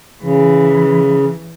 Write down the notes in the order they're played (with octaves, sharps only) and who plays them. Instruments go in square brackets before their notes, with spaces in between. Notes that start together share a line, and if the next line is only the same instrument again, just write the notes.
[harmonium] C#3 [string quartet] E3